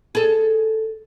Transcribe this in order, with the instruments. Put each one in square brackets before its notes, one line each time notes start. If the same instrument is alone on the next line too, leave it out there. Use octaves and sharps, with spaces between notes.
[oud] G#4 A4